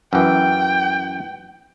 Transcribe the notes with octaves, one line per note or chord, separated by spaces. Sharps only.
F#2 E3 G5